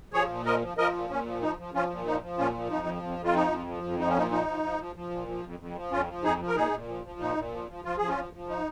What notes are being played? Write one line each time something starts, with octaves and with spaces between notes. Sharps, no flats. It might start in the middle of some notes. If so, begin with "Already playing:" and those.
F3 G#4 C#5
A#2
F3 A#4 D#5
F3
F3 A#4 D#5
A#2
A#2 C#4
F3
F3 D#4
F3
F3 C#4 F4
A#2
F3 D#4
F3
A#2 C#4 F4
F3
F2 D#4
F3
F2
F2
F4
F3 D#4
F2
F3
F2
F3 D#4
C#4
A#2 D#4
F3 D#4
F3
F3
F3
F3
A#2
F3
F2
F2
F3
F2 C#4 F4
F3
F2 D#4 G#4
F3
A#4
A#2 D#4 G#4
A#2
F3
F3
A#2 D#4
A#2
F3
F3
F3 F4
F3 G#4
C#4 F4
F3
F3
D#4